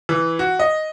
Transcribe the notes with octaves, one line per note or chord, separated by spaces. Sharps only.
E3
F#4
D#5